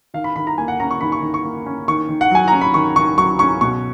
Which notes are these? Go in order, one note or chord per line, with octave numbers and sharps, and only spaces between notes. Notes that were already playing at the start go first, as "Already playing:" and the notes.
D#3 F5
B5
D#3 B5
A#5
A#3 G#5
F#5
C#4 A#5
C#6
D#3 B5
C#6
D#3
C#6
A#3
C#4
D#3 C#6
D#3
F#5
F#3 G#5
A#5
C#4
B5
D#3 C#6
D#3 C#6
F#3 C#6
C#4 C#6
B2 C#6